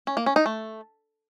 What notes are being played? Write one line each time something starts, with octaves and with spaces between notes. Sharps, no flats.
C#4
A#3
C#4
D#4
A3